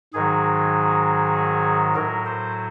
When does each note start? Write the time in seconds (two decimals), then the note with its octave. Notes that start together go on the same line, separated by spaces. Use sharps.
0.14 G#2 D#3 F#3 G#4
1.95 A2 F#3 A#4
2.26 C5